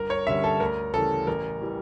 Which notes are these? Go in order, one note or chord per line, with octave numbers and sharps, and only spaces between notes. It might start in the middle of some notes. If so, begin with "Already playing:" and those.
Already playing: G1 A#4
C#5
G2 D3 G3 C#4 E5
A4
D2 A#4
C#3 E3 G3 A4
A1 A#4
E3 G3